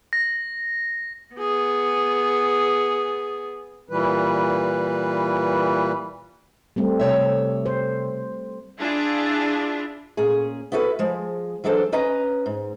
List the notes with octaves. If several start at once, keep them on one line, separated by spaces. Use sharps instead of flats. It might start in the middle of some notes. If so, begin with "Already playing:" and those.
A#6
B3 G#4
A#2 E3 G3 B4
G3 A3 C4
C3 C#5 E5
C5
D4 E4 F4 G#4
A#2 C#4 G#4
B3 E4 F#4 A4 B4
F3 G#3
E3 F#3 G#3 D4 A4 C5
C#4 B4 D#5 A#5
G#2